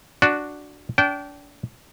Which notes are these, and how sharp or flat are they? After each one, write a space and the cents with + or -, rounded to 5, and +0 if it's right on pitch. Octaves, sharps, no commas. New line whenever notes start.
D4 +0 F#4 +0
D4 -35 G5 -20